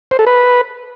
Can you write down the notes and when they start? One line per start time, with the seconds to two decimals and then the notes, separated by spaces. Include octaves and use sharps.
0.11 C5
0.19 A4
0.27 B4